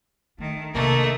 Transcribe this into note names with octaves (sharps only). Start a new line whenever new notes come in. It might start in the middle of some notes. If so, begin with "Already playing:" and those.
D#3 A3 D4
C3 A3 A#3 D4 A4 D#5